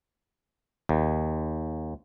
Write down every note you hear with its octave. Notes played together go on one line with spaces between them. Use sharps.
D#2